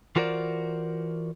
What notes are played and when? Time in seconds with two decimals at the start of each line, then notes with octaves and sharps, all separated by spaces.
0.16 E3 F4 F#4 A#4 C5 D5